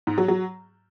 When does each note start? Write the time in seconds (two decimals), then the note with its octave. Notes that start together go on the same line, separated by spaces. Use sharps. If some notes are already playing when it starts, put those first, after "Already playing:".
0.07 G#2
0.18 F#3
0.28 F#3